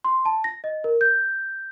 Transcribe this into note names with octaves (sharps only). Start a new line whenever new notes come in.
C6
A5
A#6
D#5
A#4
G6